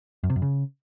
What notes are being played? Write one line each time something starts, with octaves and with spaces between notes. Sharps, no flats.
F#2
C3
F#2
C#3